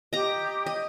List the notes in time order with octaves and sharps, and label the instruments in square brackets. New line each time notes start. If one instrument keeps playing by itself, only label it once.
[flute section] G4 [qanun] D#5 A#5
[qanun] D#5